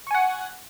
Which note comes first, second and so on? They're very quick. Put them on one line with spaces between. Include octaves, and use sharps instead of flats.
C#6 G#5 F#5